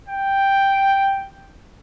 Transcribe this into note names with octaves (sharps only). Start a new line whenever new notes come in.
G5